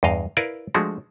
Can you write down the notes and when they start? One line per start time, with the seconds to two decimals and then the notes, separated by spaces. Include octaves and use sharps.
0.03 E2 G2 D#5 F5
0.37 E4 A#4 B4 D5 F5
0.74 F3 G#3 A3 D4 F#4